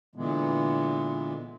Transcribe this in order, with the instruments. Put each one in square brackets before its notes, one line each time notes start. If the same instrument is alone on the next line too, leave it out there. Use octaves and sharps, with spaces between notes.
[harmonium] A#2 D3 E3 G#3 B3